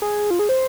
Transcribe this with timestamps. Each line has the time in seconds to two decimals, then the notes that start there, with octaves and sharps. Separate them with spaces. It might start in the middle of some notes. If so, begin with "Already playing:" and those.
0.02 G#4
0.31 F4
0.39 G#4
0.49 C5